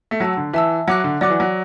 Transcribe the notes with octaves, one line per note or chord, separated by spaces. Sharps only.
A3
F#3 F#5 A5 E6
D3
E3 E5 A5 E6
F#3 F#5 D6 F#6
D3
F#3 D5 F#5 D6 F#6
E3
F#3